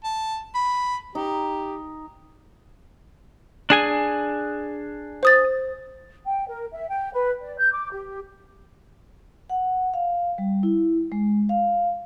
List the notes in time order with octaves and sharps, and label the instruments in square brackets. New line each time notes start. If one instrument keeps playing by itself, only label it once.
[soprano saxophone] A5
B5
[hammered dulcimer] D#4 [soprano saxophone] G4
[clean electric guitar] D4 G#4 G#5
[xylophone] C5 D#6 A6
[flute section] G5
A#4
E5
G5
B4
D5
G6
D6
G4
[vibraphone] F#5
F5
G3
E4
G#3
F5